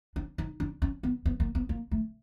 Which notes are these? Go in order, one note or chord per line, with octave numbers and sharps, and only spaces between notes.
D4
D#4
D4
C#4
B3
B3
A#3
B3
A#3
A3